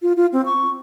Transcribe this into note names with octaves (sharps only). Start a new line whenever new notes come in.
F4
F4
C4
C#6